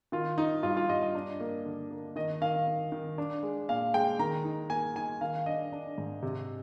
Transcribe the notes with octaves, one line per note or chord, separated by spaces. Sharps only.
D#3 F4
D#4
G2 F4
F4
G2 D#5
D#5
D4
A#3
D3
A#3
D#3 D#5
D#3 F5
D#3
D#3
D4
G#3
A#2 F5
G#3 G5
D#3 A#5
D#4
A#3 G#5
D#4 G#5
D#3 F5
D4 D#5
D4
G#2
C3